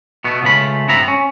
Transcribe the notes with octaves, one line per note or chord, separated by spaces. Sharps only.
B2 A3 B3
C#2 C#3 A3 F4 B5
G2 B3 C4 E5 A#5 B5
C#4